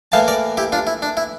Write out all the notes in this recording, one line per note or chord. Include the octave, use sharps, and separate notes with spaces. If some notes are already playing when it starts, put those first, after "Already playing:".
A2 E3 A#3 F5 A5
A#4 D5
E4 G4
D4 F4
E4
D4
E4